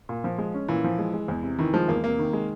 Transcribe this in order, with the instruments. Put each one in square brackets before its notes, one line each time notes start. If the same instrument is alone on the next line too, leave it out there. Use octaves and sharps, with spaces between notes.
[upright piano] A#2
F3
G#3
C#4
[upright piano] A#2 [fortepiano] E3
[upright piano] F3
G#3
G#3
E2
C3
[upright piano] D#3 [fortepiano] E3
[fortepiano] F3 [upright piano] G#3
[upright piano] E2 [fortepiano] A#3
[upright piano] C3 [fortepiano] A#3
[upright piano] D#3
G#3